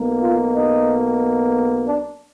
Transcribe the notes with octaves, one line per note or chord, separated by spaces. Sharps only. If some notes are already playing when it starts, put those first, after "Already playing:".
Already playing: B1 B2 A#3
F4
D#4
D4